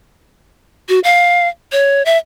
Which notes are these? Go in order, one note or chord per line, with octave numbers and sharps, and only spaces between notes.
F#4
F5
C#5
E5